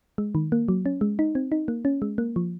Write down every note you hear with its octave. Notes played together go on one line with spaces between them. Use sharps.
G#3
D#3
A#3
F#3
C#4
G#3
D#4
C4
D#4
A#3
C#4
G#3
A#3
F3